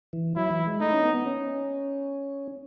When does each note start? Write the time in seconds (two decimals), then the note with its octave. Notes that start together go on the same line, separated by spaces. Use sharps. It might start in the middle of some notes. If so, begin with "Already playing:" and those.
0.13 E3
0.36 F#3 E4
0.51 E3
0.67 G#3
0.80 A3 D#4
0.93 C#4
1.03 B3
1.15 B3
1.26 C#4